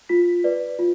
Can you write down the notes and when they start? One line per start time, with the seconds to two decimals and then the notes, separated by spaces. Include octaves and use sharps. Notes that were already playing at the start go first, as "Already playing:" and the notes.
0.09 F4 B6
0.44 B4 D5
0.79 F4